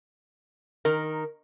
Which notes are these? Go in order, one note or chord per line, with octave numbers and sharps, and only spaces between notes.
D#3 A#4